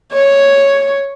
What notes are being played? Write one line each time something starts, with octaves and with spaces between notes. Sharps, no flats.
C#5